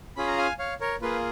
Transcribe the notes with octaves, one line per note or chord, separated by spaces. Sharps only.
C#4 F4 G#4 B5
A#5
F5 G#5
C#5 F5
A#4 C#5
A#3 F4 G#4 B4